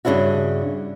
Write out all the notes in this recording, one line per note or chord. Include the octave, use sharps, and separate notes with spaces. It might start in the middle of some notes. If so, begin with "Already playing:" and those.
G2 C#3 D4 E4 F#4